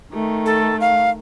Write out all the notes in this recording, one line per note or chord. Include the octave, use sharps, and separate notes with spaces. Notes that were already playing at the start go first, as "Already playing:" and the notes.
D#3 A3
A4
F5